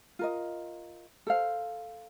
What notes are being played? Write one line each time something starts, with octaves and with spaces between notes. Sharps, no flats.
F4 A#4 D#5
A4 C5 F5